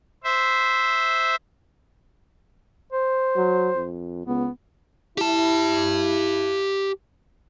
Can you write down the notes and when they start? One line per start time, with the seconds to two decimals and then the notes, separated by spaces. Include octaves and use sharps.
0.24 C5 E5
2.93 C5
3.36 F#3
3.75 F2
4.26 C#2 B3
5.18 E4 G4 A5